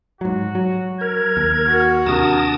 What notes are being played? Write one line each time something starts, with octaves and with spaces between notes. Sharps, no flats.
G#2 F#3 F#4
F#3
A#4 G#6
D#2
F#4
D#2 C3 D4 A#4 A5 D#6